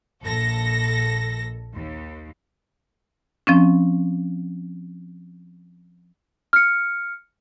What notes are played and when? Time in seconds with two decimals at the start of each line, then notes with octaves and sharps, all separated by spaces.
0.23 A#1 A4 A#6
1.74 D#2
3.47 F3 C4 C#4
6.53 F6 C#7